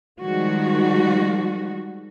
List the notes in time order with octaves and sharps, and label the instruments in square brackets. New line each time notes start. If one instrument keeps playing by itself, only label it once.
[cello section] D#3 F3 G3 G#3 F#4